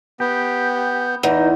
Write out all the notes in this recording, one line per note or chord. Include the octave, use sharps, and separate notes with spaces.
B3 G4 G6
E2 D#4 B4